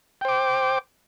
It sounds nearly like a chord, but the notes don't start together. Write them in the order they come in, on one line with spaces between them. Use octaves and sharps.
G5 C5 D6